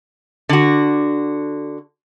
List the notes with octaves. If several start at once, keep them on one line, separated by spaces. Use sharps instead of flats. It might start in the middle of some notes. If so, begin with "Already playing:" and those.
D3 F#4